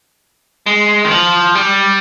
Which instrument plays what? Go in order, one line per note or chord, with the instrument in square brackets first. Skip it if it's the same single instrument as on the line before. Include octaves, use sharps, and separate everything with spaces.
[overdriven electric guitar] G#3
D#3
F3
G3